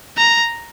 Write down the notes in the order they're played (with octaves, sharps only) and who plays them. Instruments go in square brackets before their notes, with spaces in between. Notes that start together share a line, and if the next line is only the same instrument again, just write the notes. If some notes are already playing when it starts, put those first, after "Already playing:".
[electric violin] A#5